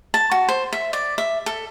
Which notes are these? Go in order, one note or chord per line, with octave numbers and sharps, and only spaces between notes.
A5
F#4
C5
E5
D5
E5
A4